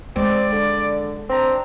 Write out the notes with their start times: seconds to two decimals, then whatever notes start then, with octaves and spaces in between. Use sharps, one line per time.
0.16 G#3 C4 D5
0.51 D3
1.30 C4 D4 A#5